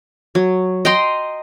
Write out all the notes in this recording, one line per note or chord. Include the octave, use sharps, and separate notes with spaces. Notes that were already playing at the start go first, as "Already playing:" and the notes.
F#3
D#5 G5 A#5 C6